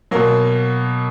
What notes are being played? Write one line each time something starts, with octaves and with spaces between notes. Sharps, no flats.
B2 F#3 A#3